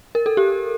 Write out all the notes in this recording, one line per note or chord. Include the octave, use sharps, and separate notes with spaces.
A#4
A4
G4